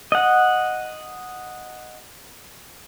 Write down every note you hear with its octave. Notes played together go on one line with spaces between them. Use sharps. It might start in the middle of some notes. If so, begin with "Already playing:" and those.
D#5 F#5